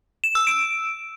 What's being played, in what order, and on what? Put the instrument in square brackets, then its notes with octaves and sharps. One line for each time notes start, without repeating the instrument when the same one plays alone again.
[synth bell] E7
E6
D7